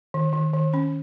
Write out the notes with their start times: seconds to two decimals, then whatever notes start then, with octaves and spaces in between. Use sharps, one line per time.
0.14 D#3
0.33 D#3
0.54 D#3
0.74 C#4